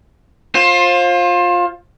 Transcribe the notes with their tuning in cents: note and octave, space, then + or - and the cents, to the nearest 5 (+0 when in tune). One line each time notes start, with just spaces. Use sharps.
F4 +15 C5 +30